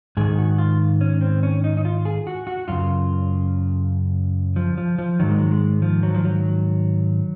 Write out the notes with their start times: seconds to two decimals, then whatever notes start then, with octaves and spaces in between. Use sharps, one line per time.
0.17 G#2 D#3 G#4
0.39 F#4
0.58 F4
1.01 C#4
1.21 C4
1.43 C#4
1.64 D#4
1.77 D#4
1.85 F4
2.05 G#4
2.27 F#4
2.47 F#4
2.68 F#2 C#3 F4
4.56 F3
4.78 F3
4.98 F3
5.19 G#2 D#3 F#3
5.29 G#3
5.39 F#3
5.51 G#3
5.82 F3
6.03 F#3
6.15 F3
6.24 F#3